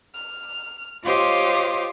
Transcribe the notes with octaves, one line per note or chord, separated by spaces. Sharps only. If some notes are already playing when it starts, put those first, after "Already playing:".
F6
F4 G4 C5 C#5 D#5 F5